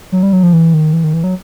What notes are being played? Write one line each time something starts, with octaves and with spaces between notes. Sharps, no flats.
F#3
G3
F#3
F3
E3
D#3
E3
D#3
E3
F#3